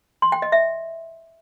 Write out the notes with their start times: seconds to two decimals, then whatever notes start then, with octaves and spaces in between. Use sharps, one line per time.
0.22 C6
0.32 G5
0.42 D#5
0.52 E5